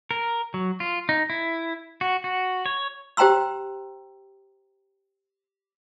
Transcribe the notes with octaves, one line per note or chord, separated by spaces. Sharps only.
A#4
F#3
F4
D#4
E4
F#4
F#4
C#5
G4 C5 G5 A#5 C6 E6